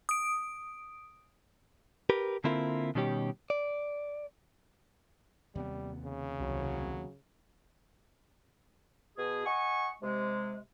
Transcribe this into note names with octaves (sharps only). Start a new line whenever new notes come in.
D#6 D7
G4 A#4 B4
D3 A#3 C4 E4 F4 A#4
B2 D#3 G3 C#4 G4
D5
D#2 C3 G3 B3
C#3
C2 F#3
B2 G#4
D#5 F#5 G#5 C#6
C3 G#3